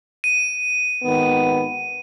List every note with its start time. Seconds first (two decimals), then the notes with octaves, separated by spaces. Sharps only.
0.24 D#7
1.03 G#1 D#3 B3